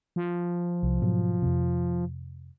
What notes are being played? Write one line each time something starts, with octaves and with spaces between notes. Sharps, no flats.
F3
C2
G#2 B2 F#3
F2 C3